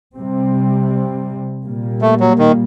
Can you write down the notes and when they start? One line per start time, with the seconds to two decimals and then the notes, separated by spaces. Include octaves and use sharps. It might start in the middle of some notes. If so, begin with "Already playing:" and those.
0.17 C3 G3 C4
1.65 A#2 G3 A#3
2.02 A3
2.20 F#3
2.39 D#3